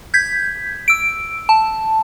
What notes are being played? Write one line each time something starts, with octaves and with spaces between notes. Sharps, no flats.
G6 G#6 B6
E6 D7
A5